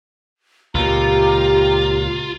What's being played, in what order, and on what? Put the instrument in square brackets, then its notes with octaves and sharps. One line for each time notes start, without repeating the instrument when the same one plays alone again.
[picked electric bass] C#2 A#2 [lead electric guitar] F4 [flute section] G4 A#5